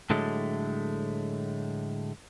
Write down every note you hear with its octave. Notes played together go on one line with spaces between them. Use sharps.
A2 D3 F#3 G#3 A3